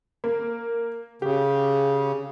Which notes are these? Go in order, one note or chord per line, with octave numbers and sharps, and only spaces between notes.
A#3
C#3 G4